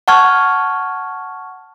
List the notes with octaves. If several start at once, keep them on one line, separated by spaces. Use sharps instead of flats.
F#5 A5 C#6 F6 G#6